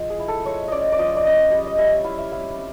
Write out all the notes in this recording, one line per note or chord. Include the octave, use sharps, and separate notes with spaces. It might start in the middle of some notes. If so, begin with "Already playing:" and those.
Already playing: F3 G#3
G#4
E4
A4
G#3 C#5
C#4 D5 D#5
D5
F3 D#5
D5
C#4 D#5
G3 D#5
D#5
G3 E5
E4 F5
E5
E4 F5
C4